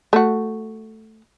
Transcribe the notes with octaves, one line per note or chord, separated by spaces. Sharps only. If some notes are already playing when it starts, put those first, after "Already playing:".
A3 F#4